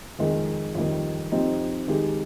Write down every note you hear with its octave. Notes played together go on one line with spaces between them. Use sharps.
F2 D#3 G#3
F2 D#3 G3
F3 C4 D#4 G4
D#3 G#3 D#4 G4